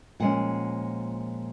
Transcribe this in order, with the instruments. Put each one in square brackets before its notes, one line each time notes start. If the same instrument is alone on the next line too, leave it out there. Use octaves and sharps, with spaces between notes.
[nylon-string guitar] A#2 F3 G#3 C#4 F#5